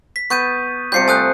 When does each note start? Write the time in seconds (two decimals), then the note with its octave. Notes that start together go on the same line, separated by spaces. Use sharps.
0.16 B6
0.30 B3 C#6 G6 D#7
0.92 C3 F3 G3 G6 C7 C#7
1.08 A3 G#5 D#6 F#6